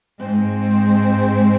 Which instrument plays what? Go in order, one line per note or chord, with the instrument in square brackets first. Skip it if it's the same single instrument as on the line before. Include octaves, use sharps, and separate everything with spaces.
[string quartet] G#2 G#3 C4